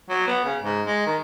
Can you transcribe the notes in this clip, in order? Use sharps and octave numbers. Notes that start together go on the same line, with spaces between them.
F#3
B3
C#3
G#2
G#3
D#3